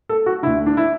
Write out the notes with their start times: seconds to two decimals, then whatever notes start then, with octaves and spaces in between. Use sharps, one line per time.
0.09 A4
0.26 F#4
0.43 D2 D3 E4
0.66 D4
0.77 E4